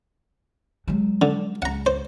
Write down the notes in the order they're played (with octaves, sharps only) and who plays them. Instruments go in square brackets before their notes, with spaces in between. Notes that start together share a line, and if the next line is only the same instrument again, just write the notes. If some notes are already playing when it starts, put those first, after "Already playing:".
[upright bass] F#3 G#3
[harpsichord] D3
[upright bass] C#2 [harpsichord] F#5 A#5
[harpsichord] C5